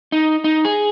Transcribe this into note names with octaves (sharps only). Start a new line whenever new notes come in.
D#4
D#4
G#4